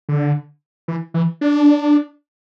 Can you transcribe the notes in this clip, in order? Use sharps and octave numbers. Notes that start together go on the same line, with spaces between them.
D3
E3
E3
D4